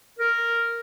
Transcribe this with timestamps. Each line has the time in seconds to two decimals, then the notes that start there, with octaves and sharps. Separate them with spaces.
0.19 A#4